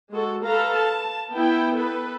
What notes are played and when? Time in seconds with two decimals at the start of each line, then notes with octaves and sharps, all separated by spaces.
0.12 G#3 F#4 A4
0.45 A4 B4 F5 A#5
0.77 A5
1.34 B3 E4 G5
1.78 A4 B4